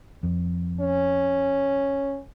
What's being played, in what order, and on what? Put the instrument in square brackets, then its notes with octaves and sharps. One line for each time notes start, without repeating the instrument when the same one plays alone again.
[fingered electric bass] F2
[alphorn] C#4